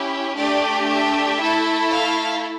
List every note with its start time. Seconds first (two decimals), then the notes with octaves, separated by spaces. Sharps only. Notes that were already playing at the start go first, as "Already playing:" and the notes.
Already playing: C#4 E4 G4
0.37 A3 D4 G4 D5
0.89 E5
1.41 A3 E4 A4
1.93 F5